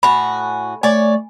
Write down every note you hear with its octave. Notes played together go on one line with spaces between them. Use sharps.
A2 F#4 G#5 B5
A3 C#5 D5 G#5